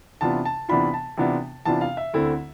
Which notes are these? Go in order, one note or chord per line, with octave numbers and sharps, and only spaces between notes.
C3 E3 B3 D4 F4 A5
A5
C3 E3 B3 D4 F4 B5
A5
C3 E3 B3 D4 F4
C3 E3 B3 D4 F4 A5
F5
E5
D2 D3 A3 C4 E4